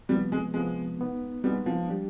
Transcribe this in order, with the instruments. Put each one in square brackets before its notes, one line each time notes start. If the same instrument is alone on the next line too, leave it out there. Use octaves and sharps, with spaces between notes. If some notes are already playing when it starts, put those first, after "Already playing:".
[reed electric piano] C3 [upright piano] G3
[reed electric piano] F3 B3
[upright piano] G#3
[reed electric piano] C3 F3 B3 [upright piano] G#3
[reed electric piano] G#3 B3 D#4
[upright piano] G3 [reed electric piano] G#3 B3 D#4
[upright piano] F3
[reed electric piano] G3 D4 G4